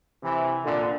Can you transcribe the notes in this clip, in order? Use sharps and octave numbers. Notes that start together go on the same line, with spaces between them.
C3 E3
A#2 D3